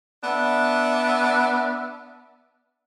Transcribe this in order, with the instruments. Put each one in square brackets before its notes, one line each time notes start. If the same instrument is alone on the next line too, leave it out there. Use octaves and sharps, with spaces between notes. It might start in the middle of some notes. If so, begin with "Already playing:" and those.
[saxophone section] B3 D4 E5